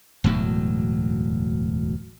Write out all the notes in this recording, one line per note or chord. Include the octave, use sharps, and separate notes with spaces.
E1 D2 A2 F#3